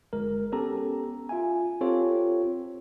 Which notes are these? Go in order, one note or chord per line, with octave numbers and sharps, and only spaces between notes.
G1 G#3 A#4
B3 C#4 G4 A4 A#5
F4 E5 G#5
C4 F4 G4 A4 C#5